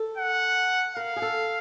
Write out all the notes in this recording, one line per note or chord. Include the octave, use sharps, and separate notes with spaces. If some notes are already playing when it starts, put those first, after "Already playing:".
Already playing: A4
F#5
A#4 F5
G#4
A4